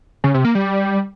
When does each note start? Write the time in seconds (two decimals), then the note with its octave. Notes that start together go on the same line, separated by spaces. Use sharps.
0.24 C#3
0.34 C3
0.45 A#3
0.55 G3